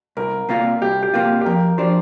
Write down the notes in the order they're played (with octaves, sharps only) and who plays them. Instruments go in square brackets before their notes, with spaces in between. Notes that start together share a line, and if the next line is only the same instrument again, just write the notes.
[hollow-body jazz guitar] C2 [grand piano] A#4
[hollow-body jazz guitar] C3 A#3 F4
[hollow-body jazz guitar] C2 [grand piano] G4
[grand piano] G4
[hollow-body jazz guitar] C3 A#3 F4
[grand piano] G4
[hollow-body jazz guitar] F2 [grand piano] A#4
[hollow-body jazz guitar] F3 D4 [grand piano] G4 C5